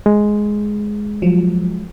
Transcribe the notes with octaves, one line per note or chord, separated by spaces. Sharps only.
G#3
F3 F#3